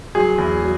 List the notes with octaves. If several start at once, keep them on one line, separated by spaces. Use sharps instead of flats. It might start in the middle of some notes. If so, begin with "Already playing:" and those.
F#3 G#4
E2
F#3